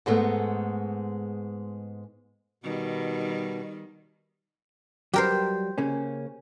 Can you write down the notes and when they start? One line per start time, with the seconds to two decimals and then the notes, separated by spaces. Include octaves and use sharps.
0.06 G#2 G#3 A3 B3
2.64 B2 D#3 G3
5.14 F#3 G3 G4 A#4 C5
5.78 C#3 A#3 C#4